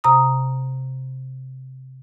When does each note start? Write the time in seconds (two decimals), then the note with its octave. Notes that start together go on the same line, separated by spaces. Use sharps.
0.04 C3 A#5 D#6